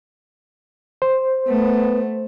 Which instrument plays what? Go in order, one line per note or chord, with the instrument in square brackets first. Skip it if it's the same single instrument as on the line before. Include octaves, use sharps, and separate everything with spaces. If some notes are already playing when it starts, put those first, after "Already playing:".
[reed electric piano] C5
[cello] A3 [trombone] B3